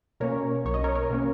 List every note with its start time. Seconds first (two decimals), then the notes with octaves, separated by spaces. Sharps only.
0.20 B2 A#3 C#4 A#4 C#5
0.65 B1 C#5
0.74 D#5
0.84 A#4 C#5
0.95 A#4 C#5
1.10 B2 A#3 C#4